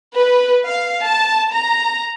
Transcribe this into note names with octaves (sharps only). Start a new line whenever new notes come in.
B4
F5
A5
A#5